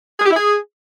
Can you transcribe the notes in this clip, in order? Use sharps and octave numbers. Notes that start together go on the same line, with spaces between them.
G#4
G4
E4
G#4